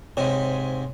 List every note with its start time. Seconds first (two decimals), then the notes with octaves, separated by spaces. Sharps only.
0.17 G#2 C3 C#5